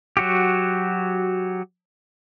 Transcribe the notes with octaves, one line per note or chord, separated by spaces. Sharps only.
F#3 F#4 G4